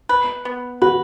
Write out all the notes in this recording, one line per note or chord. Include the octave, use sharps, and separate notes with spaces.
B4
B3
F#4 B4